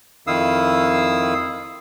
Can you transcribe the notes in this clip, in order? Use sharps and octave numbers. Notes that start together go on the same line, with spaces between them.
F2 D#3 E4 F5 D#6 E6